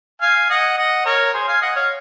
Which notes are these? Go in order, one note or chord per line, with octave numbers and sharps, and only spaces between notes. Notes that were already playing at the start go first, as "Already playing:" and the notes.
F5 G#5
D#5 F#5
D#5 F#5
A#4 C#5
G#4 C5
F5 G#5
D#5 F#5
C#5 F5